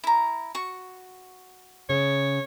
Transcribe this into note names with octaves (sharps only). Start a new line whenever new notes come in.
E4 A#5
F#4 C#6
C#3 C#5